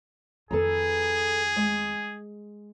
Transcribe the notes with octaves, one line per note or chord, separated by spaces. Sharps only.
F2 D#3 G#4 A4 B4 A#5
G#3